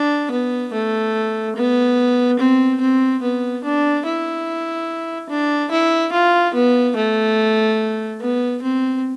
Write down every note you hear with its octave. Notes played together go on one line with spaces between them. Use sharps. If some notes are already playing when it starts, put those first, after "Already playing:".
Already playing: D4
B3
A3
B3
C4
C4
B3
D4
E4
D4
E4
F4
B3
A3
B3
C4